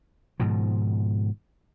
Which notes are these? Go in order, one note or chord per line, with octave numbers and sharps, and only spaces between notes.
G#2 B2 D#3 F3